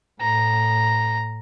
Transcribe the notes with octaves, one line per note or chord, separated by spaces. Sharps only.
A2 A#5